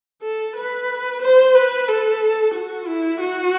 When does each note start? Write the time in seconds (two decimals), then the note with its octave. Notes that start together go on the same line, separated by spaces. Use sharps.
0.22 A4
0.55 B4
1.22 C5
1.55 B4
1.88 A4
2.54 F#4
2.87 E4
3.20 F#4